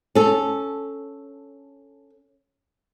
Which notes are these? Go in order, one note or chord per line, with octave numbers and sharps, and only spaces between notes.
C#4 A4